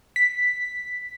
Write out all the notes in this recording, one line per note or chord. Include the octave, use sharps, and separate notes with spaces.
B6